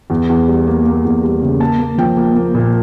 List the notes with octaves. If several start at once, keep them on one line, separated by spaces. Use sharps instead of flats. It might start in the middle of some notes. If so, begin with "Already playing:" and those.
E2
E2
G3
A#3
A#3
E2
G3
C#3
A#3 A5
A#3
F3 G5
A#3
A#3
A#2